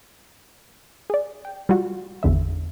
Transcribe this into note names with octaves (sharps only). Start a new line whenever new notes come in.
G#4 D5
G5
G3 F4 F#4
G#1 E2 D3 E5